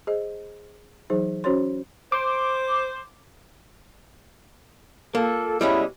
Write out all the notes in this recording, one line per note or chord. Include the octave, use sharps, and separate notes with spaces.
G#4 C5 D#5
E3 F#3 D#4 G#4 C5
C#4 F#4 C5 C#5 C6
C5 D6
A#3 F4 A4
B2 G3 G#3 C#4 E4